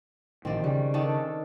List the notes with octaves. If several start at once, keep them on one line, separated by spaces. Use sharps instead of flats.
A#1 D#3 E3 C4 D5
C#3 G3
D#3 D4 A4